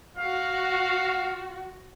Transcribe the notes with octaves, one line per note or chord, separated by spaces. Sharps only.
F#4 F5